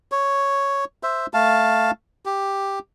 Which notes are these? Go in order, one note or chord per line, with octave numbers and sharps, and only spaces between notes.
C#5
C5 E5
A3 F5 A5
G4